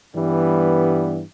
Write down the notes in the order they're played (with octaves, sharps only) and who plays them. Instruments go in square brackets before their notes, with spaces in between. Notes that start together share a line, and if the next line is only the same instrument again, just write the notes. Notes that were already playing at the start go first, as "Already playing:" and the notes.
[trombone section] G2 E3 G3 B3